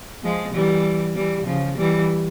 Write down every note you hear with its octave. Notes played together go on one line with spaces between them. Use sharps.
F3 G#3
E3 G3
E3 G3
C#3 F3
E3 G3